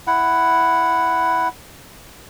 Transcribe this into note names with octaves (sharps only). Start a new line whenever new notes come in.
E4 F#5